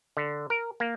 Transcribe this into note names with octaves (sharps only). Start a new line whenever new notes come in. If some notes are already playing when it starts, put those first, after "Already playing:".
D3
A#4
A#3